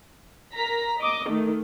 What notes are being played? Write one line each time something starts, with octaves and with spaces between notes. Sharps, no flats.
A#4 A#5 B6
D#5 D6
D#3 A3